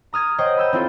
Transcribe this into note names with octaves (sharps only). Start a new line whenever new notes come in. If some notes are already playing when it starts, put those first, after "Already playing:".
A#5 D#6 F6 G#6
C5 C#5 D#5 F#5 G5
B5 E6 G6
C4 E4 F4 A4